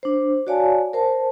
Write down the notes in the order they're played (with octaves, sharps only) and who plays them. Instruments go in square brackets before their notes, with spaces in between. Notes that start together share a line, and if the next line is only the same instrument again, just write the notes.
[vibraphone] D4 C5
F#4 C#5 D5 F5 G#5 A5
A#4 C5 A5